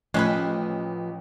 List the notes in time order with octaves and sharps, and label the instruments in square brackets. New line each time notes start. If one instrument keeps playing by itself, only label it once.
[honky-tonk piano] A1 [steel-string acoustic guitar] F3 B3 [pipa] G#3 C#4 B4